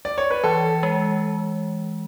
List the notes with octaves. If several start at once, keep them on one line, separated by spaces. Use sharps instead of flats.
D5
C#5
B4
E3 A4
G#3